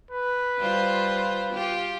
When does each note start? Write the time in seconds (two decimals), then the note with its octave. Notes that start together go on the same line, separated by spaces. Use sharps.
0.11 B4
0.59 G3 F4 C5
1.53 F4 G4